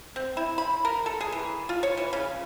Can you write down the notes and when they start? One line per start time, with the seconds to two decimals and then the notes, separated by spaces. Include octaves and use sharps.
0.16 C4
0.37 E4
0.58 B5
0.85 A#4
1.06 A4
1.21 G#4
1.32 E3
1.69 F4
1.83 C#5
1.97 E3
2.13 C#3